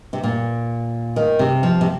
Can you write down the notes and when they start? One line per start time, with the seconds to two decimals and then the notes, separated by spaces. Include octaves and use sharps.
0.13 C3
0.23 A#2
1.16 D#3
1.39 C3
1.63 F3
1.81 C3